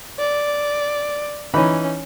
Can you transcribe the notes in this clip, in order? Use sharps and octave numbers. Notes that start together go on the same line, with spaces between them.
D5
E3 C#4 D#4 B5